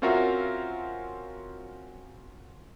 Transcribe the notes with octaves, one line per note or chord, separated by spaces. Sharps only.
C4 C#4 F4 F#4 A#4 E5